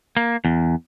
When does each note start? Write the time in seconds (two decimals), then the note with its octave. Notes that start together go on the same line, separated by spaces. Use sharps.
0.17 A#3
0.45 E2